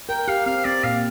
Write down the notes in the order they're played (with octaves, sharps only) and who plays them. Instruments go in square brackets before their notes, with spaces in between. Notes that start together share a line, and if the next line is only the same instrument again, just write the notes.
[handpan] A#4 [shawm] G5
[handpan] G4 [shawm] F5
[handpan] C4 [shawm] F5
[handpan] C4 [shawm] D5
[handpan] A#2 [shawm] F5